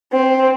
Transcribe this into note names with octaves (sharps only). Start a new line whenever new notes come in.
C4